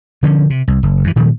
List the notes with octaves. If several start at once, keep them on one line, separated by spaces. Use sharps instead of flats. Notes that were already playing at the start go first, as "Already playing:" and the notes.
D3 F3 C#4
C3
C2
F#1
F#2 E3
A#2 D#3 F3 G3